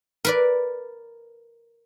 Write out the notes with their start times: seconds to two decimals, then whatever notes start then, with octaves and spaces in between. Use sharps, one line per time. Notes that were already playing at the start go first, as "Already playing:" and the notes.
0.25 A#4 B4 D5